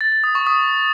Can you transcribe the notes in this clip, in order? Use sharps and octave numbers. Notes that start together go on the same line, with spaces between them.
A6
A6
D#6
C#6
D#6